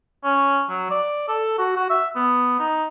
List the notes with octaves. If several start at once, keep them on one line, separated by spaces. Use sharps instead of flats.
C#4
F#3
D5
A4
F#4
F#4
E5
B3
D#4